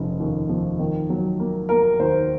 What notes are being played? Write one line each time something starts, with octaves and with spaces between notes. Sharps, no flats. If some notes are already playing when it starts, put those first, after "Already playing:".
Already playing: F1 C#3 F3
D#2
F3
D#3
F#3
A#3
A#3 A#4
D#2 C5